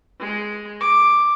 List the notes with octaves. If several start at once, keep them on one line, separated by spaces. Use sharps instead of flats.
G#3
D6